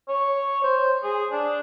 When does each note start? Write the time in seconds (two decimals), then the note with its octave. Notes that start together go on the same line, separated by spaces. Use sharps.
0.08 C#5
0.63 C5
1.04 G#4
1.32 D4